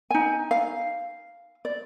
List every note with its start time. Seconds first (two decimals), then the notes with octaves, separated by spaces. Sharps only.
0.11 D#4 G#5
0.51 F5
1.65 D5